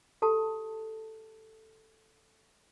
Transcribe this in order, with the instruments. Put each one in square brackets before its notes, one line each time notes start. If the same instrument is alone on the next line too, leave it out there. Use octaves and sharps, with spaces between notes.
[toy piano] G4 A4 A5